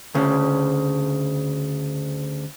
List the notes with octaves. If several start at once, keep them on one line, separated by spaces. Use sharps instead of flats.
D2 C#3